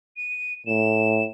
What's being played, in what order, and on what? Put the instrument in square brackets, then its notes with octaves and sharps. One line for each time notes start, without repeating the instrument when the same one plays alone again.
[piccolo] D#7
[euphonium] A2 [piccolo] E7